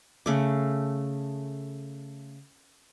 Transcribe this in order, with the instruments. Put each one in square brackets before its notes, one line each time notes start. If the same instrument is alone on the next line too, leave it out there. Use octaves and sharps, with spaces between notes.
[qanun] C#3 A3 D6